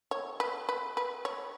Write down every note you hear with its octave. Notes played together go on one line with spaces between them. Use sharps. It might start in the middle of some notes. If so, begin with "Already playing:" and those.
C#5
B4
B4
B4
C#5